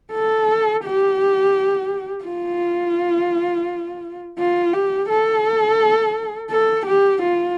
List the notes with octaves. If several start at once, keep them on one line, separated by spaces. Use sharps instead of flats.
A4
G4
F4
F4
G4
A4
A4
G4
F4